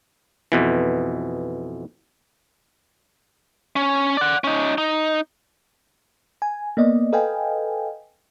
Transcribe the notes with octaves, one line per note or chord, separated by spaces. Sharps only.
F2 B2 E3
C#4
D5 F#5
C#4 D#4
D#4
G#5
A#3 B3 D5 D#5
A4 B4 D#5 F5 G5 G#5